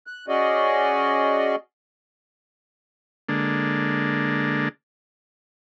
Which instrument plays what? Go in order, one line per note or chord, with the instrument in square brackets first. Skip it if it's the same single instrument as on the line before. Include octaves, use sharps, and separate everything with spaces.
[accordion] F#6
C#4 F#4 G#4 D5 D#5
[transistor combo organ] D3 G#3 A#3 D4